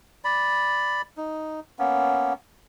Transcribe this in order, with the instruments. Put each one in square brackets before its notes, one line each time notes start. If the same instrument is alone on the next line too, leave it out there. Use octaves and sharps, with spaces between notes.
[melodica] D5 B5
D#4
A#3 B3 C#4